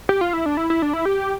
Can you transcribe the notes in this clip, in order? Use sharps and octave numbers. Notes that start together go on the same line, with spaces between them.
G4
F4
E4
D4
E4
E4
D4
E4
G4